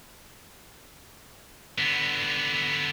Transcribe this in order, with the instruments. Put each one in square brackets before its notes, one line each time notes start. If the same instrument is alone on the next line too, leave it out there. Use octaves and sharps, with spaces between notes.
[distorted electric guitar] D3 B3